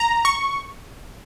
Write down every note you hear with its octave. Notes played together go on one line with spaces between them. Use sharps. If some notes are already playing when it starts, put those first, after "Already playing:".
Already playing: A#5
C#6